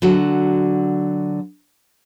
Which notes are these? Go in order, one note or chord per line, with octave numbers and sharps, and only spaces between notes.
D3 F#3 F#4